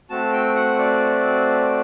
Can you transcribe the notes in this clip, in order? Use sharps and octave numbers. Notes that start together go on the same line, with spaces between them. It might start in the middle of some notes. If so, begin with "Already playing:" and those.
A3 C4 F#4 A5
G5
F#5
D5